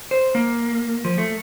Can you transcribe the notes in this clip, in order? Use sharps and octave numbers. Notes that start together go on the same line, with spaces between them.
C5
A#3
F3
A3